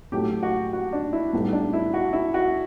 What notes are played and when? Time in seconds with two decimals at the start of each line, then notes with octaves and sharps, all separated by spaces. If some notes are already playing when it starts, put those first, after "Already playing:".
0.12 A2 F#3 A3 G4
0.43 F#4
0.73 F#4
0.93 D4
1.13 E4
1.33 B1 A2 G3 B3
1.53 D4
1.73 E4
1.94 F#4
2.13 E4
2.34 F#4